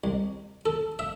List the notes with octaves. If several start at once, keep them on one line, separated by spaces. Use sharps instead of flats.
C2
A4
E5